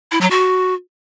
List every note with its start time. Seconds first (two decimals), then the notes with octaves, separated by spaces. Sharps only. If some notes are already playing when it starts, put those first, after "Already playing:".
0.12 E4
0.21 F#3
0.31 F#4